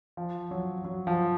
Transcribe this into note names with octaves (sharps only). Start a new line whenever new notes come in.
F3
F#3
F#3
F3